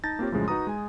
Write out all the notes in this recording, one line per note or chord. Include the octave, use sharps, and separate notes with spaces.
D#4 A5 G6 A6 A#6
A#3 C4 F4 G4 C#5
F#2 A2 C#3 F3 G#3
D#4 F#4 B4 A#5 D#6
G#3 G#5